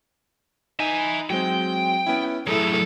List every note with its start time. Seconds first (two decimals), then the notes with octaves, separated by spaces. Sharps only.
0.79 D#4 E5 G#5
1.30 F#3 G#3 C4 G5
2.06 B3 C#4 E4
2.47 F#3 A3 E4 G#4 A4